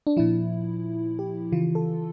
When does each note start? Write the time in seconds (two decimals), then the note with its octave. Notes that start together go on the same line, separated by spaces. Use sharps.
0.07 D4
0.17 A#2 F3 E4
1.19 G4
1.52 C#3 E3 F4
1.75 A4